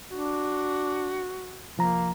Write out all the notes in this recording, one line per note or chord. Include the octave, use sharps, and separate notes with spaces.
D4 F#4
C2 F3 A#3 A#5